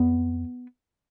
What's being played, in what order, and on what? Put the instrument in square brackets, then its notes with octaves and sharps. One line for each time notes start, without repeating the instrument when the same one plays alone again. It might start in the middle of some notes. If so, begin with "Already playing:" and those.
Already playing: [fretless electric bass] F2 B3